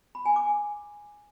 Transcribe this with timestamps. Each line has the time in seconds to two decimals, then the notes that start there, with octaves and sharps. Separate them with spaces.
0.15 B5
0.25 G#5
0.36 D6
0.47 G#5